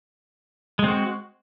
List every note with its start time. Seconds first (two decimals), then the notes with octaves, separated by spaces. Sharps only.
0.79 G#3
0.84 C4
0.88 F#4